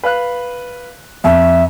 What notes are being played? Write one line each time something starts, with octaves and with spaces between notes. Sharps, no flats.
B4 F5 F#6
F2 E5